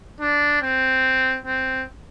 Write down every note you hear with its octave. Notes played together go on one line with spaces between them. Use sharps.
D4
C4
C4